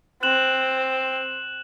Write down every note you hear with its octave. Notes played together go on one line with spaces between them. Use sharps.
C4 F#6 E7 F#7